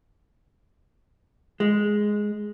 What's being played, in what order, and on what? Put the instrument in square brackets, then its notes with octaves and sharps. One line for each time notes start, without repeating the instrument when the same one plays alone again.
[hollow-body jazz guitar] G#3